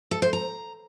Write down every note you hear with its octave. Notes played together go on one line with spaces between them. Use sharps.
A4
C5
A#5